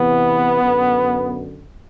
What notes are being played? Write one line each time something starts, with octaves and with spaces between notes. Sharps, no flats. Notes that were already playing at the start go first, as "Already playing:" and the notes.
Already playing: E2 C3 E3 B3
F#2 D3